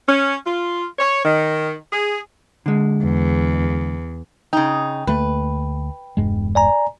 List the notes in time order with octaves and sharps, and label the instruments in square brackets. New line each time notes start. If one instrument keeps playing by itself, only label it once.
[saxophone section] C#4
F4
C#5
D#3
G#4
[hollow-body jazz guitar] D3 G#3
[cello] E2
[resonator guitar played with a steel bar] C#3 D#4 [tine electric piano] G5
[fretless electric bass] D2 A3 A#3 [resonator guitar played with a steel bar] B4
[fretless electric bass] E1 G2 G#3
[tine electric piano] D5 G#5 A#5